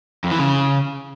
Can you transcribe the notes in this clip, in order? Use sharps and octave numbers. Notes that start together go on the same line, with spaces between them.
F2
E3
C#3